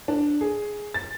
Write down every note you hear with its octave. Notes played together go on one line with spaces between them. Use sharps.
D4
G#4
A6